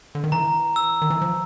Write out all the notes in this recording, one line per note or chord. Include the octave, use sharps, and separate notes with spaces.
D3
D#3
E3 A#5
E6
D#3
E3
F3